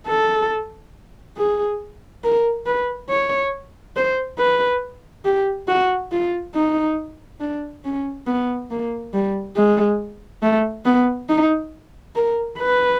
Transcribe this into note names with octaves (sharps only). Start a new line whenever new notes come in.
A4
G#4
A#4
B4
C#5
C5
B4
G4
F#4
F4
D#4
D4
C#4
B3
A#3
G3
G#3
A3
B3
D#4
A#4
B4